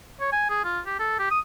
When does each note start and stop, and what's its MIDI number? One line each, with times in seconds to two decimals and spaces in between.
0.20 0.30 73
0.32 0.47 80
0.49 0.64 68
0.64 0.80 65
0.86 0.96 67
1.00 1.19 69
1.19 1.31 67
1.31 1.40 87